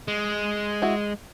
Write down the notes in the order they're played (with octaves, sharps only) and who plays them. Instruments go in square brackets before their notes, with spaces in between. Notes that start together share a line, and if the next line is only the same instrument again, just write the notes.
[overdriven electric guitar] G#3
[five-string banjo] E4 F#4